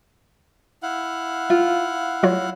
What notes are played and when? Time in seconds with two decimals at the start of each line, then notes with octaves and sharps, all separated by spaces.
0.83 E4 F5 F#5
1.50 F4
2.23 F#3 F4 C#5